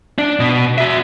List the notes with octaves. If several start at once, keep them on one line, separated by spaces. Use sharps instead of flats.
D4
B2
F#4 E5